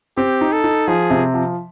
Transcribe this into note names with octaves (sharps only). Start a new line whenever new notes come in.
C4 G4
D#4
A4
D#4
F3 G#4
C3
F3